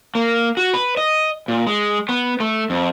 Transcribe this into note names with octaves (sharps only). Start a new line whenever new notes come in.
A#3
F#4
B4
D#5
A#2
G#3
B3
A3
F2